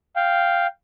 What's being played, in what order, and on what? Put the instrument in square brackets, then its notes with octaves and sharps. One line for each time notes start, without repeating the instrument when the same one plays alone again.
[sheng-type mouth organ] F5 G5